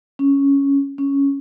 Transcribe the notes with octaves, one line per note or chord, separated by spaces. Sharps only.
C#4
C#4